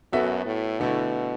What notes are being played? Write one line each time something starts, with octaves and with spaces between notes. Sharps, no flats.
F#2 B3 F#4 A4 E5
A2
B2 D3 A3 E4